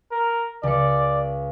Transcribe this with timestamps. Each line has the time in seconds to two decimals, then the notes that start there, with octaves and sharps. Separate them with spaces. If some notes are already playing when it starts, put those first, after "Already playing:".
0.11 A#4
0.63 C#2 D5 C#7